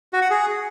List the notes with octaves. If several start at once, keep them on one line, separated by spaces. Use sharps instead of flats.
F#4
F#5
G#4